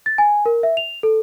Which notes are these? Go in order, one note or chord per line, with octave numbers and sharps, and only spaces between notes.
A6
G#5
A#4
E5
F7
A4